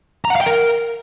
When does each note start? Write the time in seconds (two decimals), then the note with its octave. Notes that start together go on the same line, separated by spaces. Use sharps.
0.25 A#5
0.30 F#5
0.36 F5
0.41 G5
0.46 A#4